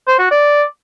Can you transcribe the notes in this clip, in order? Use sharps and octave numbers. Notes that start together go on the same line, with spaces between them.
C5
F#4
D5